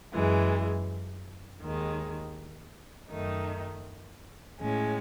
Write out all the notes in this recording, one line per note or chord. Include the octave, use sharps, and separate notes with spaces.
F#2 E3 G#3
D#2 D#3 G#3
F#2 D#3 A3 D#4
A2 G#3 C#4